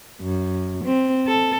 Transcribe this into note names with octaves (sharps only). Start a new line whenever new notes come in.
F#2
C4
A4